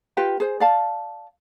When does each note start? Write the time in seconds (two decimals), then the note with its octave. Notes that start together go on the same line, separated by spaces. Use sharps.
0.17 F4 G4 B4 G5
0.40 G#4 C5
0.60 D5 F5 A5